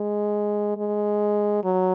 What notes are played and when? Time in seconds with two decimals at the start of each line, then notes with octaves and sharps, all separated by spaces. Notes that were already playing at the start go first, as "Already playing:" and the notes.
Already playing: G#3
0.77 G#3
1.64 F#3